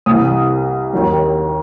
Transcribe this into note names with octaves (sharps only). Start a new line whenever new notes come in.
C2 C3 E3 D#6
D#2 D#3 F#3